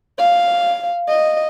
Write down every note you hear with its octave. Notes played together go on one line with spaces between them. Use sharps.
F5
D#5